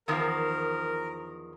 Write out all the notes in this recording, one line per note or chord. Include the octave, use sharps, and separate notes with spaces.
E2 D#3 F3 A#4